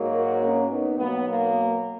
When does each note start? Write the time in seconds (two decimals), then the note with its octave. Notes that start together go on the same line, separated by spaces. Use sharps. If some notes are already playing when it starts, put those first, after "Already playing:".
Already playing: G#2 F#3 A#3
0.13 F#4 A#4
0.41 A#3 C#4
0.70 B3 D#4
0.97 B2 F#3 A#3 B3
1.26 A#3